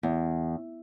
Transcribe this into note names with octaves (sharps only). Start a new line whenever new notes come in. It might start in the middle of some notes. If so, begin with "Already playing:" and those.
E2